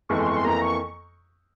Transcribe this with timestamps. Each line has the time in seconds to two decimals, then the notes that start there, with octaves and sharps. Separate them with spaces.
0.09 G1 F2 E3 G#3 C#6
0.19 C6
0.27 C#6
0.36 C6
0.44 F2 E3 A#3 A#5
0.62 C#6